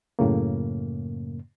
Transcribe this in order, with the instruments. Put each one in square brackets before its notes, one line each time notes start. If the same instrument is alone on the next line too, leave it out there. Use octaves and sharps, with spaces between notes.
[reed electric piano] F#2 A2 C#3 A#3